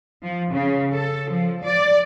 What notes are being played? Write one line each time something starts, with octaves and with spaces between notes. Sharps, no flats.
F3
C#3
A4
F3
D5